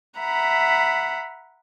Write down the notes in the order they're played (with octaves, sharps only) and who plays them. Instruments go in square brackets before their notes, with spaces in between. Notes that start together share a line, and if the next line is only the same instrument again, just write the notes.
[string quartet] E5 F#5 A#5 B5